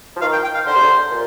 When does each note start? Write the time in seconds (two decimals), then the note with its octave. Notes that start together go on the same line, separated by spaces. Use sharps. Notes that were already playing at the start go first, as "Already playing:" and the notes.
0.16 F3
0.21 D#3 F5
0.32 G5
0.44 G5
0.54 F5
0.66 D3 C5
0.75 C3
0.83 D3
1.11 A#2